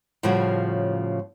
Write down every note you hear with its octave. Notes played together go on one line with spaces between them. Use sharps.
A2 C#3 F3 G3 F#4